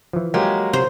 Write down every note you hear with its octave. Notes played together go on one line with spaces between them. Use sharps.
E3 F3
F#3 G#3 A#3 G4
C3 C5